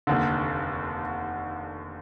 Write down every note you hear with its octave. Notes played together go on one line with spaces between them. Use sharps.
F1 D#2 D3